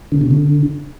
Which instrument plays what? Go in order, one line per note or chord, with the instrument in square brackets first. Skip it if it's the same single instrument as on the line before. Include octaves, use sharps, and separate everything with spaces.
[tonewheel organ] D3
C3
D3